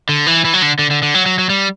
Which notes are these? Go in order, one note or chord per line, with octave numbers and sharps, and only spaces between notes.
D3
E3
E3
F#3
D3
D3
D3
D3
F#3
F#3
F#3
G3